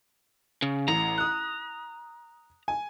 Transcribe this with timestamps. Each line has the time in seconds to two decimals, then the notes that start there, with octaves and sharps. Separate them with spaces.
0.62 C#3
0.88 A1 A#5 F7
1.18 D#6 F#6
2.68 G#5